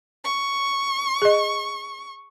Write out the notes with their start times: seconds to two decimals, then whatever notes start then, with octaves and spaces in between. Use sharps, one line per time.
0.24 C#6
1.22 G#4 D#5